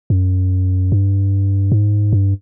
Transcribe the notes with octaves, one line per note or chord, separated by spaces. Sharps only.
F#2
G2
G#2
G2